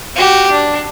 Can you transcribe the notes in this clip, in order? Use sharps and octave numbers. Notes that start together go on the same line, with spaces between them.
F#4 G4
D4